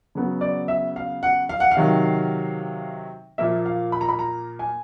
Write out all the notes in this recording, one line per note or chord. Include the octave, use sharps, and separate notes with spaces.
C#3 F#3 B3
D5
E5
F5
F#5
F5
F#5
F5
C3 D#3 F#3
A#2 F3 A#3 E5
F5
B5
A#5
B5
A#5
G#5